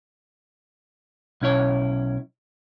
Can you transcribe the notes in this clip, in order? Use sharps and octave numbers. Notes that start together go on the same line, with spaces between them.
B1 C#4 E4 C#5